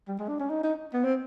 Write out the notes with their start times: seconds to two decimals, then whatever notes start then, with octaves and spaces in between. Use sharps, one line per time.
0.08 G3
0.19 G#3
0.28 D4
0.40 C#4
0.50 D#4
0.63 D#4
0.93 B3
1.04 C4